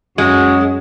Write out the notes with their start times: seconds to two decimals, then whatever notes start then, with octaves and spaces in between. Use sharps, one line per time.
0.18 F#2 G#3 C#4 F#4